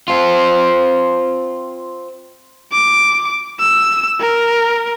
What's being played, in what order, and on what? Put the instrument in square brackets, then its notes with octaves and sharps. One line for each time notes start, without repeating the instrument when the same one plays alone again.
[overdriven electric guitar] C4 F4
[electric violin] D6
E6
A#4